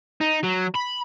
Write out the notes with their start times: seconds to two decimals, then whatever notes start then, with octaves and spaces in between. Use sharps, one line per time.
0.21 D#4
0.44 F#3
0.75 B5